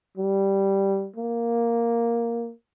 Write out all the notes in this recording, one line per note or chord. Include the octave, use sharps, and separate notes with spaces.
G3
A#3